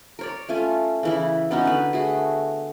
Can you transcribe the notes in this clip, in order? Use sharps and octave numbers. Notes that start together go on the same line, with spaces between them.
A#4 C#5 D5
A3 C#4 F4 G#5
C#3 E3 E4
B3 C#4 D#4 F#4
D3 B4
A3 F#4 G#4